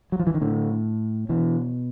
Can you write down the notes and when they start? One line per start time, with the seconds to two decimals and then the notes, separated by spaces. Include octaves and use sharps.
0.12 F#3
0.20 F3
0.27 E3
0.34 D#3
0.41 A2 D3
1.29 B2 E3